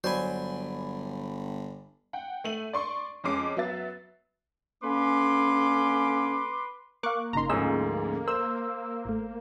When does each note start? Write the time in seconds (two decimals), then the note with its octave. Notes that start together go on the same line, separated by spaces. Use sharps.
0.04 G1 F#3 C5 D5 G#5 B5
2.13 F#5 G5
2.44 A3 D#7 F#7
2.73 D5 C6 C#6
3.24 F2 G#3 C#4 D#5 D6 C7
3.57 F#3 B3 E5 A6
4.83 D3 A#3 C#4 B4 C6 D6
7.03 A#3 A#4 F5 C#6 D6 F#6
7.33 G1 C#3 D#4 A#5 C6
7.49 D2 G#2 F3 C#4 G#4 D#5 E6
8.28 A#4 C5 E6
9.05 G#1 A3